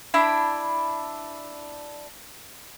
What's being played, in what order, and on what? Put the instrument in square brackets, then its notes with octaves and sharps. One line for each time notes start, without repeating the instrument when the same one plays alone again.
[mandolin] D4 E4 B5